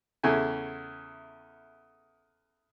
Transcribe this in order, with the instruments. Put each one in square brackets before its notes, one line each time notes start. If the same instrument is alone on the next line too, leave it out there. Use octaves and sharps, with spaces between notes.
[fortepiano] E2 C#3 A3 G#5